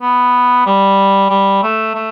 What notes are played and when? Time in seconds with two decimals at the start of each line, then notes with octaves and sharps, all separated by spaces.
0.02 B3
0.66 G3
1.30 G3
1.63 A3
1.95 A3